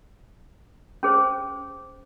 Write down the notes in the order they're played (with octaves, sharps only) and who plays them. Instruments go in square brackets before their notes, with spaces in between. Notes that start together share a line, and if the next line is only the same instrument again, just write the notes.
[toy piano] C#4 G#4 C5